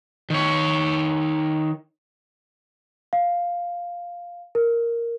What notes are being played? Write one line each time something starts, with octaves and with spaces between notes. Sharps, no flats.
D#3 C#5
F5
A#4